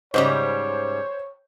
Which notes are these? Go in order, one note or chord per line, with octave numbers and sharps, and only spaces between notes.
G#2 C#3 G3 C5 C#5